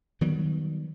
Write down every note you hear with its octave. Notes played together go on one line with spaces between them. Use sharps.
D#3 F#3 G3 B3